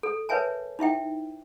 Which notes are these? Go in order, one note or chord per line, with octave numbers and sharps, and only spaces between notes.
A4
A#4 B4 C#5 E5 G#5 A5
D#4 E4 E5 G5